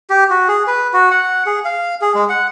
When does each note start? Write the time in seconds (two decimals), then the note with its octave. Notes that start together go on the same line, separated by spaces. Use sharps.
0.10 G4
0.30 F#4
0.48 G#4
0.67 B4
0.93 F#4
1.11 F#5
1.46 G#4
1.65 F5
2.01 G#4
2.15 G#3
2.29 F#5